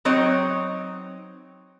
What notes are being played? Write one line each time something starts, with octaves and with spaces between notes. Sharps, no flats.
F#3 C4 D#4 C#5